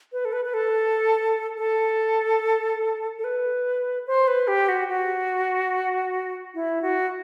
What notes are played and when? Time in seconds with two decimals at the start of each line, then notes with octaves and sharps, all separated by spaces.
0.13 B4
0.25 A4
0.33 B4
0.45 B4
0.54 A4
1.58 A4
3.19 A4
3.24 B4
4.07 C5
4.28 B4
4.48 G4
4.69 F#4
4.89 F#4
6.55 E4
6.82 F#4